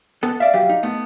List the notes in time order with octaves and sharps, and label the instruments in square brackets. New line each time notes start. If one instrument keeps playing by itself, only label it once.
[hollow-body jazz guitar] B3 A4
[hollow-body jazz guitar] D5 E5 [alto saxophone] F5
[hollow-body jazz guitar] F#3 G4
D#4
A3 B3